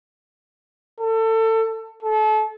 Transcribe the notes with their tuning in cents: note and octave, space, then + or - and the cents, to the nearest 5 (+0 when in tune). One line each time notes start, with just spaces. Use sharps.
A4 +25
A4 -30